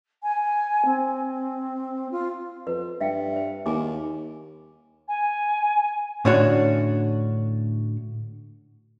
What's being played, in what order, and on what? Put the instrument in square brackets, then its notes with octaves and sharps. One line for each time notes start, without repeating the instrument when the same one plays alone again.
[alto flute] G#5
C4
F4
[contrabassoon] F2 [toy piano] B4
[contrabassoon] G2 [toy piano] E5 F5 G5
[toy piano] C5
[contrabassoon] D#2 [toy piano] G#4 G#5 D6
[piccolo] G#5
[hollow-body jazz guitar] A2 D3 C#4 D4 F#4